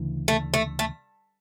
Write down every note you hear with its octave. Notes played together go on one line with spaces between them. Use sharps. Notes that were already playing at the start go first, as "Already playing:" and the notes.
Already playing: D2 C#3 E3
A3
A3
A3